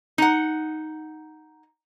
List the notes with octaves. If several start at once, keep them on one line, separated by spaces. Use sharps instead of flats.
D#4 F#5